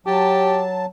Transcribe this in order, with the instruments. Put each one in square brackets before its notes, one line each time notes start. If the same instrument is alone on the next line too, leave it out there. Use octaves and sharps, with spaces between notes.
[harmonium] F#3 A5 [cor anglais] G4